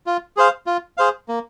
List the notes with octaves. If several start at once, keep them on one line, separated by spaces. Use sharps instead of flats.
F4
G#4 C5 F5
F4
G#4 C5 F5
A#3